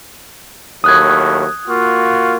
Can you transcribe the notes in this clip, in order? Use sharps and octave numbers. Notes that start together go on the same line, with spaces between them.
D#2 A2 F#3 D#6 F#6 G#6
A#3 F4 F#4